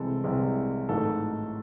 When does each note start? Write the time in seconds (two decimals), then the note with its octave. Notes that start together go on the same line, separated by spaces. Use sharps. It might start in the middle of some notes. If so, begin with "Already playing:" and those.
Already playing: C2 C3 E3 G#3 C4 A4
0.24 C2 C3 E3 G#3 C4
0.89 A1 G#2 D#3 F#3 A3 A4